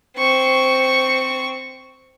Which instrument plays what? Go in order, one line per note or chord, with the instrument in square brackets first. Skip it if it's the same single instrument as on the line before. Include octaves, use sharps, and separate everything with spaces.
[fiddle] C4 C#6